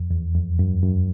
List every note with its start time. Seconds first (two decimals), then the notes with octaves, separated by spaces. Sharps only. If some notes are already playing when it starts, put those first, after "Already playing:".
Already playing: F2
0.11 E2
0.34 F2
0.59 F#2
0.82 F#2